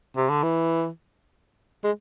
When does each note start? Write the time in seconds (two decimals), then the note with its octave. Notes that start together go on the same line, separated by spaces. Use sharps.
0.16 C3
0.29 D3
0.43 E3
1.84 G#3